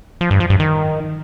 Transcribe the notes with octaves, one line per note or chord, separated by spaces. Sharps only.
F3
G2
F3
G2
D#3